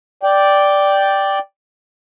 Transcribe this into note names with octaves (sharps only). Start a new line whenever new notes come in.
D5 G5